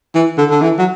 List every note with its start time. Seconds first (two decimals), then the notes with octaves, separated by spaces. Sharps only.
0.15 E3
0.38 D3
0.51 D3
0.62 E3
0.79 F#3